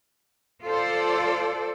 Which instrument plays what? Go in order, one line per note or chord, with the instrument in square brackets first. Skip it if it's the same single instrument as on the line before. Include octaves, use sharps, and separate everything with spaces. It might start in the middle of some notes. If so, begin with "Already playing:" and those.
[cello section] F4 A4 C5 D5